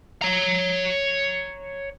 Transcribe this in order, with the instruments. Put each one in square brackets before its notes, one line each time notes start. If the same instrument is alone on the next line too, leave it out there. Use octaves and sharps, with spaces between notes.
[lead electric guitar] C#5 A#5